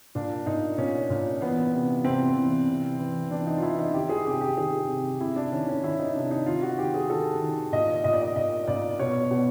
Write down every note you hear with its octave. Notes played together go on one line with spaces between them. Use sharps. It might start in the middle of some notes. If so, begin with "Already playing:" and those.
A#2 D4
A#2 D#4
A#2 C#4
A#2
E3 B3
C3
C3 C4
E3
C3
E3
E3 D4
D#4
F4
E3 E4
D#4
D#3 G4
G#4
C3 G4
G4
D#3 G#4
C3
C3 E4
D4
D#3 C#4
C#4
D#3 E4
D#4
C3 D4
D#4
D#3 F4
F#4
D#3 G4
G#4
D#3 A4
D#3
A#2 D#5
A#2 D#5
D5
D#5
A#2 D#5
A#2 D5
B2 C#5
B2